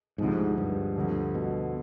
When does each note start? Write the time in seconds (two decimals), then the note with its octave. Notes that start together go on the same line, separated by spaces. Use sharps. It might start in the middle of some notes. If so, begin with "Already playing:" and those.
0.18 D2 G#2 C3 F3 G#3
0.58 G2
0.96 D2 D3 F3
1.35 B2